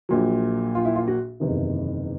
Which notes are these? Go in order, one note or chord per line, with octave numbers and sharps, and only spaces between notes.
A#1 A#2 F#3
F4
E4
F4
F#4
F#1 E2 C3 D#3